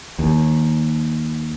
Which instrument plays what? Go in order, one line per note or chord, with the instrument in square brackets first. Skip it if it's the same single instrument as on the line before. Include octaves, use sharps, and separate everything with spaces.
[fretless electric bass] D#2